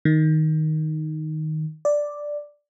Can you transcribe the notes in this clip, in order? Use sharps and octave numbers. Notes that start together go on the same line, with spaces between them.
D#3
D5